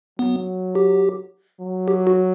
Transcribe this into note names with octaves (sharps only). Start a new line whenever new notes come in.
F#3 B3
G4
F#3
G4
F#4